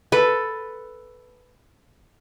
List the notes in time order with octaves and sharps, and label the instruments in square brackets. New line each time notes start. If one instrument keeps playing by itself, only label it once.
[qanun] A4 B4